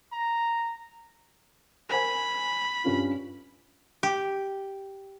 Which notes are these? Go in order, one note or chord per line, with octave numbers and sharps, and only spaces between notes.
A#5
A#4 C5 G#5 B5
G2 C#4 F4
G4